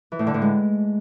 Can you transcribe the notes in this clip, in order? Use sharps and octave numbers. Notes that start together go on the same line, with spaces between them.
E3
A2
D3
A2
G#3